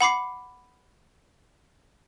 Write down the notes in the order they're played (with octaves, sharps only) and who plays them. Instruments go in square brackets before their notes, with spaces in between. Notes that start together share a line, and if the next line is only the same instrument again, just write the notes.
[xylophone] F#5 B5 D6 C7